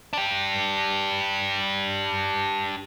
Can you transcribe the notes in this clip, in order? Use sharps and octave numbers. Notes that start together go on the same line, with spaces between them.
D4 G4